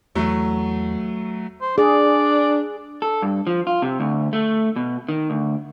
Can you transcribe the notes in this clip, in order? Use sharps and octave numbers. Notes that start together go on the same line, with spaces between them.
E2 F#3 A3
C5
D4 G#4 D5
A4
G2
F3
F4
C3
D2
A3
B2
D#3
D2